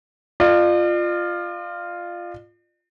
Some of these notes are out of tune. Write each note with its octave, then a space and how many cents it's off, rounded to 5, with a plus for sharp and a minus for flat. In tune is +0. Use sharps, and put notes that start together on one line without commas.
F4 +0 D5 +45